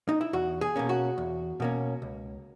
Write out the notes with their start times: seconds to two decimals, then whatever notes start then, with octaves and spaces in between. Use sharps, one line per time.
0.09 D#4
0.21 E4
0.33 E2 F#4
0.61 G#4
0.76 B2 A#3 C#4
0.89 F#4
1.18 E2
1.60 B2 A#3 C#4
2.02 C#2